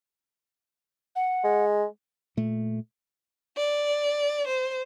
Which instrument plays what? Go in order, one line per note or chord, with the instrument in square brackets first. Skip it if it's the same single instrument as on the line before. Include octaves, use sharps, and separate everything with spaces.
[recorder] F#5
[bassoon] G#3
[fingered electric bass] A#2 A3
[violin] D5
C5